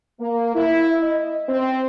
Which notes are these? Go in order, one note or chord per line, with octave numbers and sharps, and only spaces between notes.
A#3
E4
D#5
C4